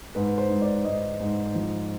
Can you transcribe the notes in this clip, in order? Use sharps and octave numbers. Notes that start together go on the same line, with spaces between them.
G#2 B4
C5
G#2
D5
G#2 D#5
G#2
F3